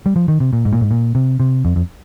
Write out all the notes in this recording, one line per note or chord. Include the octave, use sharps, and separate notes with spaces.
G3
F3
D#3
C3
A#2
G#2
A#2
G#2
A#2
C3
C3
F2
F2